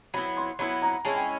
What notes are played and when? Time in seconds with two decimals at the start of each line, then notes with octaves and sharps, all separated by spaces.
0.14 F#3 B3 E4 B5
0.37 C6
0.59 F#3 B3 E4 B5
0.82 A#5
1.05 G#3 C#4 E4 A5
1.16 G5